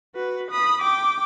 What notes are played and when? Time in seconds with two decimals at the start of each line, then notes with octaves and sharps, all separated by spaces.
0.15 F#4 B4
0.51 B5 D#6
0.81 G5 D6